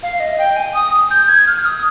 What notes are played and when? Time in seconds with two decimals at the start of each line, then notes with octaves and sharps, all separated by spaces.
0.03 F5
0.20 D#5
0.39 G5
0.56 G#5
0.74 D#6
1.11 G6
1.28 G#6
1.47 F6
1.65 D#6